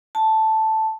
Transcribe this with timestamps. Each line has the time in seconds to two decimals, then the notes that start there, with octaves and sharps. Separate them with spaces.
0.15 A5